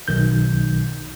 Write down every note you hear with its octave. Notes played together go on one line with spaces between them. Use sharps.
B1 D#3 G6